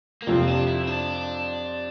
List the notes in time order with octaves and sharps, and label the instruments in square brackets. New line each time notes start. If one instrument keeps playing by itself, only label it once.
[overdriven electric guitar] A#3
[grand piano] F2 C3 F3 [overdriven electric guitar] C4
[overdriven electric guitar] D4
E4
C4
D4